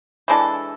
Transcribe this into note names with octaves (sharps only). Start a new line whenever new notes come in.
E3 G#3 D4 A4